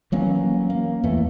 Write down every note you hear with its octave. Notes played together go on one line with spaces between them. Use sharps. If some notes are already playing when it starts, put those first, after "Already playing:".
E3 F#3 A#3 C#4
A#3
E2 E3 A3